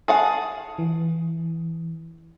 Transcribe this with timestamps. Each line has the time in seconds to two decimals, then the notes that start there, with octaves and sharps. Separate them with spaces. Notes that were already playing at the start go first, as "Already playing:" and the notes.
0.08 G#4 F5 F#5 A5
0.78 E3